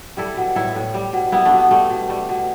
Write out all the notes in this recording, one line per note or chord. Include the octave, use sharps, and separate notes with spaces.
G3 E4 A4
B2
A2 E4 A4
A2
G3
B2
G3 B3 E4
A3 D4
B2
B3
G3 A3
B2
G3 A3
B2